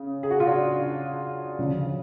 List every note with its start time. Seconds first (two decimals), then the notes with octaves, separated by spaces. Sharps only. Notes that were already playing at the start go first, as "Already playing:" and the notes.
Already playing: C#3
0.23 G#4
0.31 F#4
0.40 F4
0.47 D4
1.59 D2 C#3 F3